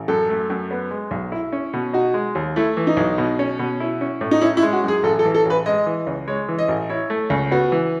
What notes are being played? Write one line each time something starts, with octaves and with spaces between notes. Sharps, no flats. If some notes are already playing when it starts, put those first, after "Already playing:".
Already playing: A1
F#2 A4
A3
F#2
B3
G#3
B1
E4
C#4
B2
D#4 F#4
G#3
D#2
A3 E4
E3
D#4
B1
B2
C#4
B2
E4
C#4
A2
D#4
C#4 E4
E4
G#3
F#4
F#2 G#4
A1 A4
A4
E3
A4
A1 B4
G#3 D#5
E3
C#2
G#3 C#5
E3
D#5
A1
E4 C#5
A3
C#2
B3 F#4
E3